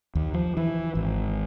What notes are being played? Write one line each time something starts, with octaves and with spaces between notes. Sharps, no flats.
D#2
F3
E3
G#1